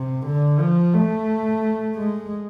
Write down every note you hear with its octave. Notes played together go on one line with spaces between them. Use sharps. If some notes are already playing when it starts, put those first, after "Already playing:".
Already playing: C3
D3
F3
A3
G#3